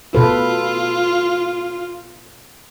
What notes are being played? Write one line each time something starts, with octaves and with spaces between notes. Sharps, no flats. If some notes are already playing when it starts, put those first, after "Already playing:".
B2 F4 A4 B4